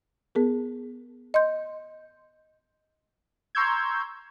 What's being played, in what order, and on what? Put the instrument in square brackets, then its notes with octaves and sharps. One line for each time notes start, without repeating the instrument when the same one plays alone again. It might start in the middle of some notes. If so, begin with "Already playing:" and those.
[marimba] B3 G#4 A#4
D#5 C6 G6
[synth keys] A#5 C6 C#6 E6 G6 G#6